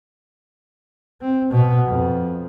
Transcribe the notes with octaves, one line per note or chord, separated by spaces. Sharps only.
C4
B2 B3
F2